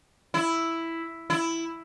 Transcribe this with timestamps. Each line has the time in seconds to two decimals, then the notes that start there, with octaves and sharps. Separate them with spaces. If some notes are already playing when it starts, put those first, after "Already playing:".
0.34 E4
1.30 E4